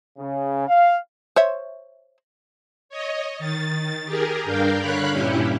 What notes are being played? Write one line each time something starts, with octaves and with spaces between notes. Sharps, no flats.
C#3
F5
C5 C#5 E5
C#5 D#5
D#3 A6
G4 G#4 A#4
G2 D4 A#4 F5 G5
D3 C#5 F5 B5 F#6
G2 A#2 C#4 E4 G4